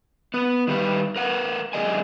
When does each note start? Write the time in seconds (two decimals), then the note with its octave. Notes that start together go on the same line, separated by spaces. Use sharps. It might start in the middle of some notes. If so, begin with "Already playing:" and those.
0.34 B3 B4
0.67 D#3 G3 B4
1.16 A#4 B4 F#5
1.73 F#2 C3 G#4 D5 D#5 G#5